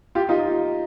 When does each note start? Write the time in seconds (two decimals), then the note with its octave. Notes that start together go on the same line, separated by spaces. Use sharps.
0.15 F4 G4
0.29 D#4 F4